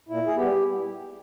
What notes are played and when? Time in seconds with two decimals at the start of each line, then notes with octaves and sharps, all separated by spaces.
0.09 A#2 E4
0.26 G#4
0.36 G3 B3 G4